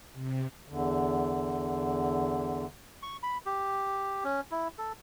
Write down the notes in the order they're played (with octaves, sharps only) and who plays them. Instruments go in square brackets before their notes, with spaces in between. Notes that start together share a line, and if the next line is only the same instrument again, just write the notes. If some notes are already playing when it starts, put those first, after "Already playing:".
[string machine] C3
[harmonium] E2 D3
[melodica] C#6
B5
G4
C#4
E4
A4